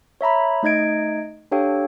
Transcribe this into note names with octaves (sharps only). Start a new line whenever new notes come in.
C#5 E5 A#5 B5
A3 D#4 D#5 G#6 D7
D4 G4 A4 C#5 F5 G5